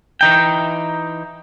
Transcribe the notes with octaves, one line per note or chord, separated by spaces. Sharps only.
E3 D#4 G5